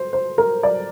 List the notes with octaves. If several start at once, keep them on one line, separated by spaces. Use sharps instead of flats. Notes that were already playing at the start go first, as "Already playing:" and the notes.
Already playing: C5
C5
A#4
D5